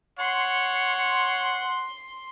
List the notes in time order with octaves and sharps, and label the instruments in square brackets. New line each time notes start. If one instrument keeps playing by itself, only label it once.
[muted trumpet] C#5 [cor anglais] F#5 [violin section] C6